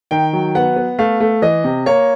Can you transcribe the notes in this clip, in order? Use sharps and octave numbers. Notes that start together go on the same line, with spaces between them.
D#3 G5
F#3
B3 F#5
B3
A3 F5
A3
E3 D#5
C3
A#3 C#5